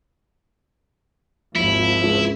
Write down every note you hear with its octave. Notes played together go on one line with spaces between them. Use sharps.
G#1 D#2 F3 E4
C#2